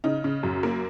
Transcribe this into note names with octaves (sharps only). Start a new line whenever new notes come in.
C#3 D#4
C#3
F#2
A#3